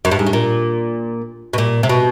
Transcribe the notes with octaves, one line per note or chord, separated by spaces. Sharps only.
F#2
G2
G#2
A2
A#2
B2
A#2
C3
B2